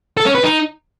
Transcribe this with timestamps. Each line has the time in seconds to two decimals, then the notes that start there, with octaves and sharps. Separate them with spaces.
0.17 A4
0.26 C#4
0.35 B4
0.43 D#4